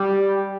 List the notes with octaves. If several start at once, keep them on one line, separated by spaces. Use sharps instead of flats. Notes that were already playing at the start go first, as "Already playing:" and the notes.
Already playing: G3